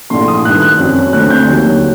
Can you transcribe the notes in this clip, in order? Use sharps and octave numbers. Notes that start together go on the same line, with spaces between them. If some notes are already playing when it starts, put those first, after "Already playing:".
A#1 A2 A3 C6
D#6
G2 D#3 A3 F#6
F#6
F#2 F#3 C4
D2 D3 A3 C4 F#6
G6
D#2 D3 F#3 A#3